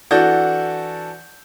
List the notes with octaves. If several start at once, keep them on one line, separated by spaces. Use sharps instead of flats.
E3 D4 F#4 A4 G6